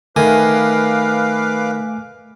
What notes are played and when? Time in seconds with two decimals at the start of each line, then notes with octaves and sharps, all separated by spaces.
0.16 D#3 A3 B4 F5 G#5 D6